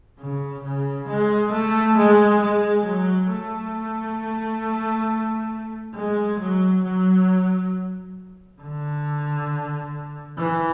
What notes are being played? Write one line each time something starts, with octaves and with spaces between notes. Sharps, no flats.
C#3
C#3
G#3
A3
G#3
G#3
F#3
A3
G#3
F#3
F#3
D3
E3